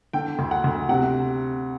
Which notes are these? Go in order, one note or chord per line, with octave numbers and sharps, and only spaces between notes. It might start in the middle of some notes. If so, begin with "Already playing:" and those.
D3 G5
D2
F#5
D2
C3 F#5